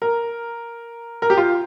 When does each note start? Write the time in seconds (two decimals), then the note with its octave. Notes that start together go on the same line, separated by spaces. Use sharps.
0.02 A#4
1.22 A#4
1.30 G4
1.37 F4